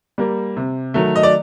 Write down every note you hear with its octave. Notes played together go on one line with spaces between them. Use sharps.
G3 A#3
C3
D#3 F#3 A3
D#5
D5